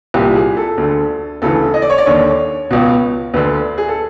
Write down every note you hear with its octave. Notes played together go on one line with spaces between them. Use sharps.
C2 A#2 G4
G#4
A4
D2 D3
D2 C#3 E3 A4
D#5
D5
C#5
D5
D#2 D3 C#5
C#2 B2
D2 D3 B4
G#4
A4